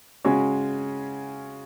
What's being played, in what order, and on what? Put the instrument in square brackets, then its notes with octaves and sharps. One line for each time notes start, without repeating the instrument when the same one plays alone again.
[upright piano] C#3 G#3 C#4 F#4